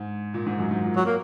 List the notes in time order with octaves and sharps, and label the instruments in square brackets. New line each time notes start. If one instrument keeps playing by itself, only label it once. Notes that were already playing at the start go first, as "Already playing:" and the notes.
Already playing: [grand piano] G#2
A#2
G#2
F#2
G#2
A#2
[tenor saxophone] F#3
A#3